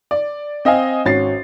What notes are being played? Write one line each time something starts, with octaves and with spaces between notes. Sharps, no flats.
D5
C4 D#5 F5 G#5
G#1 C#4 F#4 A6 C7